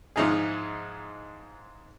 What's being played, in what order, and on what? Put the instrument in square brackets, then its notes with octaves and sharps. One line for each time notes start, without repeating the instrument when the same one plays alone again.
[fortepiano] G#2 F3 G#3 D#4 E4 G#4